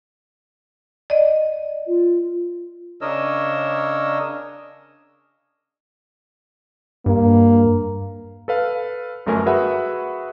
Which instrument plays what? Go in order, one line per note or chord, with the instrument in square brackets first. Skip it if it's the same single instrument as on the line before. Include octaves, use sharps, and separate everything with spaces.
[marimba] D5 D#5
[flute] F4
[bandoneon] C#3 D4 A#4 C#5 D#5 E6
[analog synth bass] G2 [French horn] A#3
[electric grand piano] A4 B4 F5
G1 F#2 A3 A#4 G#5
F#4 G#4 B4 E5 F#5 B5